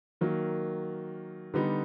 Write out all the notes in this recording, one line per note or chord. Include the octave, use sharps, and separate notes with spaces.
D#3 F#3 A#3
D3 G3 B3 D#4